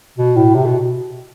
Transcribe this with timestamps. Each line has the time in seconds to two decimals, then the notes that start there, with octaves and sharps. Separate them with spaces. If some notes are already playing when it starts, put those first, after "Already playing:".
0.19 B2
0.36 A2
0.55 C3
0.66 B2